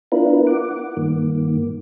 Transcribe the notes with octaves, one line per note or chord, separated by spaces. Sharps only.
B3 D4 E4 F4 A#4 B4
F#5 D6
G2 D#3 A#3